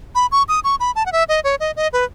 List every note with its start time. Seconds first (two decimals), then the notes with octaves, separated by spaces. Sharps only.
0.15 B5
0.32 C#6
0.48 D#6
0.64 C#6
0.80 B5
0.95 A5
1.06 F#5
1.12 E5
1.29 D#5
1.44 C#5
1.60 D#5
1.76 D#5
1.93 B4